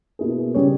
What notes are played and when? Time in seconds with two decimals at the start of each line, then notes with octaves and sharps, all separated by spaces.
0.19 B2 A#3 E4 G#4
0.54 C#3 G3 C#4 G#4 C#5